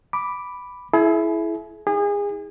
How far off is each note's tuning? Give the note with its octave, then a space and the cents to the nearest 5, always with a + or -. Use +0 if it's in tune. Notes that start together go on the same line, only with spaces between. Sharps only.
B5 +0 D6 +0
E4 +5 G#4 +40
D#4 +45 G#4 -30